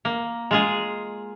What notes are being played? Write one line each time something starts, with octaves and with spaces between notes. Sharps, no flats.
A#3
G#3 F4 G#4